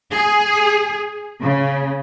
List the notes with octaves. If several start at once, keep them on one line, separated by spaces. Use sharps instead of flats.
G#4
C#3